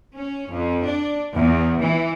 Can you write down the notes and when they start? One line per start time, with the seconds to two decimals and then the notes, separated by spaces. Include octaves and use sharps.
0.14 C#4
0.51 F2
0.84 D4
1.34 E2
1.81 E3